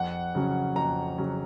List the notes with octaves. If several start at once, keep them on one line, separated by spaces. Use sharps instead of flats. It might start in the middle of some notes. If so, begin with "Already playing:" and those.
Already playing: F2 F#5
C#3 F#3 C#4
F2 A#5
C#3 F#3 C#4